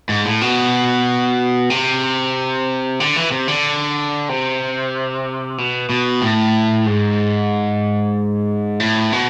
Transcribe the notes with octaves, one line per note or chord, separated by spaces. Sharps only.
G#2
A2
B2
C3
D3
E3
C3
D3
C3
B2
B2
A2
G#2
A2
B2